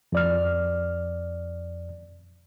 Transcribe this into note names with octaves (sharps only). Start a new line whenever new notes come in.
F2 D5 F6